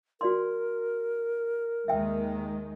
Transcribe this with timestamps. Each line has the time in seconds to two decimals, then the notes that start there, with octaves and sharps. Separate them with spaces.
0.21 F#4 A#4 D5 C6
1.88 D#2 D#3 G#3 E5 G5